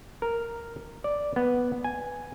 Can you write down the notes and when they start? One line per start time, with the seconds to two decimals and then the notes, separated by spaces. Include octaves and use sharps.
0.22 A#4
1.04 D5
1.36 B3
1.84 G#5